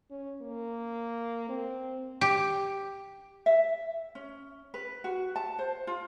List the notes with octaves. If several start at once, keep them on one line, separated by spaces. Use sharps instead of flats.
C#4
A#3
C4
G4
E5
C#4
B4
F#4
A5
C5
F4